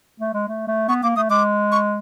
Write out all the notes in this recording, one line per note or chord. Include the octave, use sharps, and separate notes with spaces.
A3
G#3
A3
A3
B3 C#6
A#3 D6
A3 D#6
G#3 D6
C#6